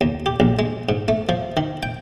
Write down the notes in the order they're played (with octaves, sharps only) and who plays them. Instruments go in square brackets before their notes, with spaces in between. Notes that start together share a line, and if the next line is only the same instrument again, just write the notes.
[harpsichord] D#2
G4
A#1
G#3
G#2
A3
F3
D#3
G5